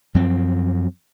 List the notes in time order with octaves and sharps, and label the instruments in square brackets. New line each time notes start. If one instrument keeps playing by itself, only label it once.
[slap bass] F#2 F3 C4